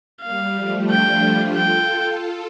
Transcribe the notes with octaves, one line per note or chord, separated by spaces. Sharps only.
G3 A#3 F5
F3 A3
D4 F4 G5
F4 A4 G5